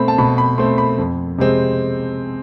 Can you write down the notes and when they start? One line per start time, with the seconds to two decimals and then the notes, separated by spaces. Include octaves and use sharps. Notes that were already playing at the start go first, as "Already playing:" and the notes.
Already playing: B2 A3 C4 B5
0.08 A5
0.18 B2 B5
0.38 B5
0.58 A3 C4 C6
0.78 B5
0.98 F2
1.38 C3 G#3 C4